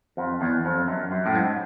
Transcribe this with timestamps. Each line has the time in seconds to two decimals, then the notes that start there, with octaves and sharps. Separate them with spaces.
0.17 F2
0.41 E2
0.65 F2
0.87 F#2
1.11 F#2
1.26 A2
1.35 G#2